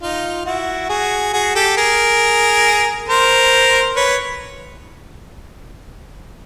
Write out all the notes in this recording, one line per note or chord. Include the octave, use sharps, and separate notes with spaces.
D#4 F4
E4 F#4
F#4 G#4
F#4 G#4
G4 A4
G#4 A#4
A#4 C5
B4 C#5